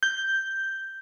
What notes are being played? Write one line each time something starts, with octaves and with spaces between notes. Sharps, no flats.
G6